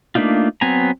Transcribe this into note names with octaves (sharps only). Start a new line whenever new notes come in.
A3 A#3 D4 D#4 F4
F#3 B3 C4 G#5 A#5